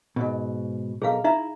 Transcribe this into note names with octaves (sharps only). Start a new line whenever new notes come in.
G#2 B2
B1 G#4 A#4 F5
D#4 E4 E5 A#5